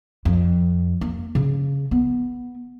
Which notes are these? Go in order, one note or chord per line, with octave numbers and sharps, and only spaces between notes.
F2
A#3
C#3
B3